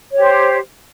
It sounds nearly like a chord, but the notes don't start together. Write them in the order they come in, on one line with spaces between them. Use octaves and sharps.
C#5 G4 C5